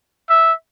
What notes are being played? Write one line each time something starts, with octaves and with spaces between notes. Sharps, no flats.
E5